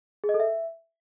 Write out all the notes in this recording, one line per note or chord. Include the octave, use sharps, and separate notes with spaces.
G#4
D#5
A4
E5